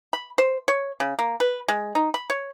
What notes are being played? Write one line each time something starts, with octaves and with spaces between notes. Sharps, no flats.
B5
C5
C#5
C#3
A#3
B4
G#3
D#4
B5
C#5